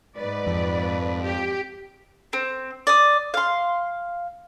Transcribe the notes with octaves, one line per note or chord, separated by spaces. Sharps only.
G#2 B4 D5
F2
G4
C4
D5 D#6
F5 C6